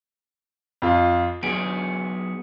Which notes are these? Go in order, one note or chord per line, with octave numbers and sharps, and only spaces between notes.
F2 F4
F#3 B3 G#4 D7